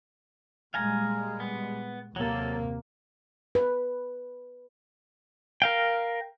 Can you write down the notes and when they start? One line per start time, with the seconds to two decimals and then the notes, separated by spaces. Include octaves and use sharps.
0.74 A#2 G3 G#3 F5 G#5 A#5
1.40 B3
2.16 D#2 C3 F#3 A#3 A4
3.55 B4
5.62 A#4 F5 G5